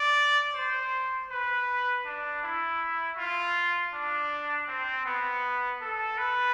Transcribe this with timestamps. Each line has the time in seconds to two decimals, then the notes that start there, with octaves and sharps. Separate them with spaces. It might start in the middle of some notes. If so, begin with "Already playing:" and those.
Already playing: D5
0.54 C5
1.30 B4
2.05 D4
2.43 E4
3.17 F4
3.93 D4
4.68 C4
5.05 B3
5.81 A4
6.18 B4